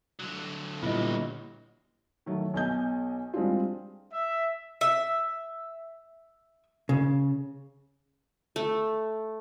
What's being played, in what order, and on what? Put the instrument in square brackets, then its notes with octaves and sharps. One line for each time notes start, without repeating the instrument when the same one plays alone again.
[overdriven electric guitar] D3 F#3
[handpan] A#2 [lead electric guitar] G3 B3 [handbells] E4 D#5
[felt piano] D#3 F#3 A3
B1 B2 D#5 G#5 G6
G3 G#3 C4 D4 F4
[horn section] E5
[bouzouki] E5
[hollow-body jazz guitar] C#3
[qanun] A3